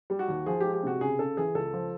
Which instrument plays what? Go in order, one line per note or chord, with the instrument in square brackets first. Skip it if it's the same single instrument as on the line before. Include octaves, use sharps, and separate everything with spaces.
[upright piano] G3
F#4
D#2
F3 G#4
G#3 G4
G4
C3 F#4
C#3 G#4
C#3 A4
E3 G#4
C#2 A4
F3